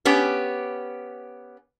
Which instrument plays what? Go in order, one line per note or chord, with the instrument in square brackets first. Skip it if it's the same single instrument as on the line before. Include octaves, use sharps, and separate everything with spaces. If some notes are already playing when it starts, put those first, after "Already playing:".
[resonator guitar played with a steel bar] B3 C#4 G4